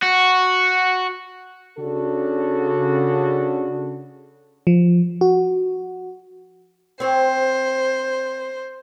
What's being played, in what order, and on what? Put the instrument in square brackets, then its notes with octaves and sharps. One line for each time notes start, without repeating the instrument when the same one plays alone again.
[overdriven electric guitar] F#4
[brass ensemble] C#3 D4 F#4 A4
[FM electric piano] F3
F#4
[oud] C4 C#5 [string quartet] C5